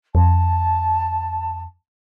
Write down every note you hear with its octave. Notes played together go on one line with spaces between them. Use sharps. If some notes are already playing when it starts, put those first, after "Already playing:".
F2 A5